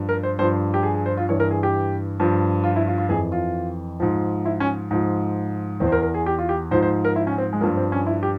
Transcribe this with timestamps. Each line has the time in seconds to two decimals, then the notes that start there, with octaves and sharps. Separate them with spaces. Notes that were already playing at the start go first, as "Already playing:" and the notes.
Already playing: G2 F3
0.09 A#4
0.23 C5
0.39 G2 F3 C5
0.74 G4
0.83 G#4
0.94 G#4
1.06 C5
1.17 F4
1.29 G2 E3 C#5
1.40 A#4
1.51 G#4
1.63 G4
2.20 G2 F3
2.64 F4
2.76 E4
2.87 F4
2.98 F4
3.09 F2 E3 G#4
3.32 F4
4.00 G#2 F3
4.45 E4
4.60 C#4
4.91 G#2 F3
5.80 E2 E3 C4
5.87 C5
5.92 A#4
6.03 A#4
6.14 G#4
6.26 G4
6.39 F4
6.49 G4
6.71 G#2 F3 C5
6.82 C5
7.05 A#4
7.16 E4
7.27 C#4
7.38 C4
7.53 G#3
7.61 G2 F3 A#3
7.77 C4
7.92 C#4
8.06 E4
8.23 G4